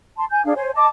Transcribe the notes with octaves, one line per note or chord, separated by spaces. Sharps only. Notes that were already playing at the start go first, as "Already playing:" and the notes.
A5 C6
G#5 G6
D4 G#4 F5
C5 C#5 G#5
D#5 A5 D6